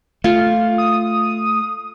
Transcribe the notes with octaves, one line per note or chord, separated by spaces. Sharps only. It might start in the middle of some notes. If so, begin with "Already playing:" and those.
A3 F4 F5
D#6